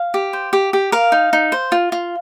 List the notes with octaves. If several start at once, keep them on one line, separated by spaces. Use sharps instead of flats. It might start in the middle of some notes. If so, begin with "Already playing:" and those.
Already playing: F5
G4
C5
G4
G4
A#4 F5
D#4
D#4
C5
F4
F4